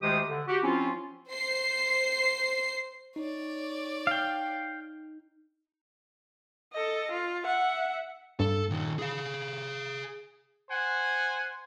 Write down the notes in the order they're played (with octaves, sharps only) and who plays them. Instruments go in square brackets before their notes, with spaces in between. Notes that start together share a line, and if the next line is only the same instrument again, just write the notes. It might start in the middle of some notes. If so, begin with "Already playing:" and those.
[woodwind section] D2 D#3 G#3 G4 C5 D#6
D3
F#4 G4
F3 C4 C#4 E4 F4
[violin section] C5 C7
[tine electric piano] D#4 [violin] C#5 D5
[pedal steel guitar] F5 G5
[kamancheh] A4 D#5
F4
E5 F#5
[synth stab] G2 [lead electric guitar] A4
[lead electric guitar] A#2 D#3
G#4 F5
[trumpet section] C5 F#5 G#5